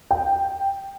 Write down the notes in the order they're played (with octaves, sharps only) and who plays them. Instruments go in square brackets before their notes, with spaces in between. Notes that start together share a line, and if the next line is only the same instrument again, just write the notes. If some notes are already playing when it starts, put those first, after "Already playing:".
[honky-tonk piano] G5